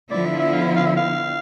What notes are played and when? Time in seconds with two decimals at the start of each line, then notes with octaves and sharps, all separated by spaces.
0.11 D3 F3 B3 E4 D5
0.25 E5
0.39 E5
0.53 F5
0.76 F5
0.85 E5
0.96 F5